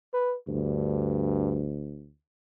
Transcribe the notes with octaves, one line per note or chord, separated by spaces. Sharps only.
B4
D2 G2